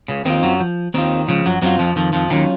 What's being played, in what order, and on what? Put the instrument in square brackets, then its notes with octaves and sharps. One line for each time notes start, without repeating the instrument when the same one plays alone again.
[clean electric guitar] C#2 C#3
[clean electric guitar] D#2 D#3 [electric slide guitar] C4 F4
[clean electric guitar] F#2 F#3
[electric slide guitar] F3
[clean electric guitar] D#2 D#3 [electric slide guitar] C4 F4
[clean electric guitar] C#2 C#3 [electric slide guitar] F3
[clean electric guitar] F#2 F#3
[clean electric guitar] F#2 F#3 [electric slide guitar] C4 F4
[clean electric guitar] F2 F3
[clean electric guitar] F2 F3 [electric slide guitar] D#3
[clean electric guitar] F2 F3
[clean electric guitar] D#2 D#3 [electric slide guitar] F#3 C#4 F4